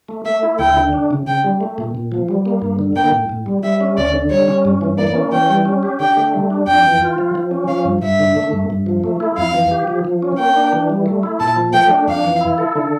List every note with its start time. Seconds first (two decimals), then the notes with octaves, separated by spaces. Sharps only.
0.09 A3
0.25 A3 E5
0.43 E4
0.59 D2 G5
0.77 D3
0.93 D4
1.11 C#3
1.27 C#3 G5
1.44 G3
1.61 A3
1.78 A#2
1.95 A#2
2.12 F3
2.29 G3
2.46 A#3
2.62 G2
2.79 D3
2.96 A#3 G5
3.12 A2
3.29 A2
3.46 G3
3.63 G3 E5
3.81 C#4
3.97 D2 D5
4.13 D3
4.30 G3 C#5
4.48 C#4
4.65 G2
4.81 E3
4.98 A#3 D5
5.15 C#4
5.32 E3 G5
5.49 G3
5.65 C#4
5.83 G4
6.00 D3 G5
6.17 A3
6.34 G3
6.50 D4
6.67 F2 G5
6.84 E3
7.01 F4
7.18 F3
7.35 F3
7.51 C#4
7.68 F3 F5
7.85 G2
8.02 G2 E5
8.20 D3
8.37 A3
8.53 G2
8.70 G2
8.86 F3
9.04 A3
9.20 E4
9.38 F2 F5
9.54 E3
9.71 G4
9.87 F3
10.05 F3
10.22 C#4
10.38 A#3 G5
10.56 D4
10.73 E3
10.90 G3
11.06 A3
11.23 E4
11.40 A#2 A5
11.56 F3
11.73 A3 G5
11.91 D4
12.07 F2 F5
12.24 E3
12.41 E4
12.58 A4
12.75 D3